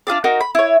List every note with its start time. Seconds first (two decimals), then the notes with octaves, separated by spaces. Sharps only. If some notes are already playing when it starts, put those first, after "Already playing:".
0.07 D4 F4 G#4 D5
0.24 D#4 F#4 A#4
0.41 B5
0.55 E4 C#5